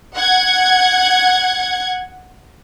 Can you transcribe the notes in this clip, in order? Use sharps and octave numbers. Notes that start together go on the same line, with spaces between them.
F#5 G#6